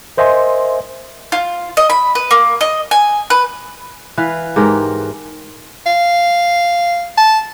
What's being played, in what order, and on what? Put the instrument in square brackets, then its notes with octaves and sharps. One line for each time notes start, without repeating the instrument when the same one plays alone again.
[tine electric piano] A#4 C5 D#5 E5 G#5 C6
[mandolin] F4
D#5
B5
B4
A#3
D#5
G#5
B4
[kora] E3 B4 F5
G#2 G4 A#4 G5
[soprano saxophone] F5
A5